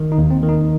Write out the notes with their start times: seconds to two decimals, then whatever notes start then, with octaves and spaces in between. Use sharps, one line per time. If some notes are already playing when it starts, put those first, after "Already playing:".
Already playing: D#3
0.12 D#4
0.18 D#2
0.31 C4
0.43 D#3
0.49 D#4